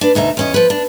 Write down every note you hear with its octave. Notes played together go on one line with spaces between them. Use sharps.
D4 B4
D2 B2 D#4 E5
E2 C#4 D#5
F3 B4
D4